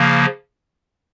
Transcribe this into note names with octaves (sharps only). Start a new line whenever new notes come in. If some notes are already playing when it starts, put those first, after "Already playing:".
Already playing: C#3 F3 A#3